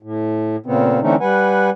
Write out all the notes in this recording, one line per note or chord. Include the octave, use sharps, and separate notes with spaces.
A2
A#2 C#3 B3 C4
D3 E3 A3 C4 C#4 D#4
G3 B4 F#5 G#5